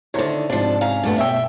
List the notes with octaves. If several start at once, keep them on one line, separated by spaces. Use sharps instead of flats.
D3 D#3 E4 C5 C#5
G#2 C3 F3 D4
C#4 F5 A#5
G2 A#2 A3 B3
B2 E5 G5 E6